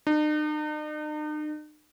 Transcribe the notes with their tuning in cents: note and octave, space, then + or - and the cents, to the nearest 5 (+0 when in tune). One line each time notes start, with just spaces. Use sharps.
D#4 -45